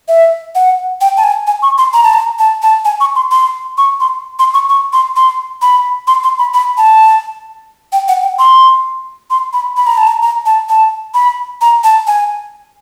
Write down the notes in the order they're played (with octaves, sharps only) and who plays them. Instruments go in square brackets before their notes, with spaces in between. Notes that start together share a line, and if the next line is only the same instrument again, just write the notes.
[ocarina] E5
F#5
G5
A5
G#5
G#5
C#6
C6
A#5
A5
A#5
A5
A5
G#5
C#6
C6
C6
C#6
C6
C6
C#6
C#6
C6
C6
B5
C6
C6
B5
B5
A5
G5
F#5
G5
C6
C6
B5
B5
A#5
A5
A#5
A#5
A5
A5
B5
A#5
A5
G#5